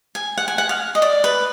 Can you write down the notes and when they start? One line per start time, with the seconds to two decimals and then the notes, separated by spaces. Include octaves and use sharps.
0.15 G#5
0.38 F#5
0.48 G#5
0.58 F#5
0.69 F5
0.95 D#5
1.02 D5
1.24 B4